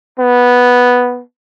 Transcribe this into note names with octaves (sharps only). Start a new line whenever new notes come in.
B3